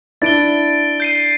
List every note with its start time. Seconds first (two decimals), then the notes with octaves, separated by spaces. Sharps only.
0.22 D4 E4 A6 D7 G7
1.00 G6 C7 D#7